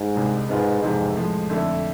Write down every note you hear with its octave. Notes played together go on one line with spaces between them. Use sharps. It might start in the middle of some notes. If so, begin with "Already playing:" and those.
Already playing: G#2
C2 C3 G#3 D4
G#2 B2 B3 F4 B4
F2 G#2 C3 E3
A2 F3 G#3
F2 D3 A3 E4